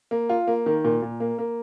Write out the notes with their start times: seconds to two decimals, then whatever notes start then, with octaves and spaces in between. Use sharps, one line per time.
0.11 A#3
0.29 F4
0.47 A#3
0.66 D#3
0.85 A#2
1.02 A#2
1.20 A#3
1.38 A#3